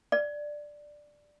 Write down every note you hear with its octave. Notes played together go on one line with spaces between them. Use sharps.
D5